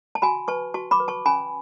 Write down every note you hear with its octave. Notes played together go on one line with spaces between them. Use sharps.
A5
F#4 G#5 B5
B4 A5 C#6
F#4 A5 C#6
B5 D6
B4
A5 C#6
C#4 G#5 B5